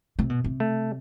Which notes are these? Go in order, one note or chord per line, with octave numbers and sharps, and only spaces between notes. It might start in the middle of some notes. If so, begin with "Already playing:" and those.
C3
B2
C3
A3